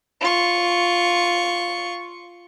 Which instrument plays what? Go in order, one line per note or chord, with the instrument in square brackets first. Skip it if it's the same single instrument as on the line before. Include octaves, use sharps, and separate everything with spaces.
[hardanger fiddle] F4 C#6